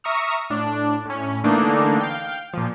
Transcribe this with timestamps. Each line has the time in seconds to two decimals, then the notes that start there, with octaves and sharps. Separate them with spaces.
0.04 E5 A#5 C#6 D#6 F6
0.50 A2 D4
1.06 A2 C#4
1.44 D3 E3 A3 A#3 D4 D#4
2.01 F5 G5
2.53 A#2 F3